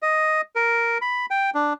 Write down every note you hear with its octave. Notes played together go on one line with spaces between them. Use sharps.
D#5
A#4
B5
G5
D4